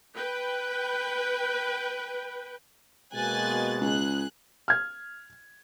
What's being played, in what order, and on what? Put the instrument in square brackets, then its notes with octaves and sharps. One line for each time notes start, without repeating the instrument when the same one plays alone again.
[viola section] B4 G5
[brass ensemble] B2 G#3 A#3 [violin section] G#5 F#6 A6
[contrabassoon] C#2 [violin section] G#4 F#6
[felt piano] F6 G#6